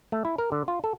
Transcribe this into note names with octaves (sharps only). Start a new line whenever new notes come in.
A3
E4
A#4
D3
F4
A4